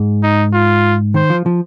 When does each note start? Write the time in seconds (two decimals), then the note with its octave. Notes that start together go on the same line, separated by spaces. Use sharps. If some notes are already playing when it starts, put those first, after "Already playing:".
Already playing: G#2
0.23 D#4
0.53 F4
1.14 D#3 C5
1.30 F3
1.46 F3